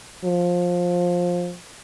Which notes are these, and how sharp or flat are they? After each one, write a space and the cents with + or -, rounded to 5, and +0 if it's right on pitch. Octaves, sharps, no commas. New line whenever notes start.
F3 +15